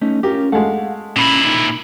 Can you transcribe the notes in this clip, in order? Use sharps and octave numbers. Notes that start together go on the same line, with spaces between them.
A3 C#4 D#4
C#4 F4 G4 A#4
G#3 A3 F5 F#5
A#2 C#4 E4 B5
B1 D#4 B5